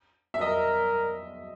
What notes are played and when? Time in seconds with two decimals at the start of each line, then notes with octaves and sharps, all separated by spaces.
0.34 E5
0.40 A#4 D#5